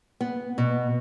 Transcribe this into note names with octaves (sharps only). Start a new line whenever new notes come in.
B3
B2